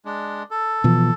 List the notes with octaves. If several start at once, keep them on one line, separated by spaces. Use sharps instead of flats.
G#3 D4
A4
B2 E3 F3